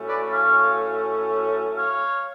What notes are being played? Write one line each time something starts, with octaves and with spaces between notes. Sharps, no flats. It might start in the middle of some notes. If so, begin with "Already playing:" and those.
Already playing: A2 F#3 A3 C#4
B4 D5
C#5 F5
C#5 F5